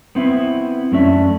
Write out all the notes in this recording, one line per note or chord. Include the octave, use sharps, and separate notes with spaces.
B3 C4 E4
F#2 A3 C#4 D4 E5